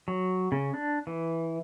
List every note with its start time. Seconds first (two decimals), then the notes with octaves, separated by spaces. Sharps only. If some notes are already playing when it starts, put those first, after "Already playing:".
0.08 F#3
0.52 C#3
0.74 D4
1.07 E3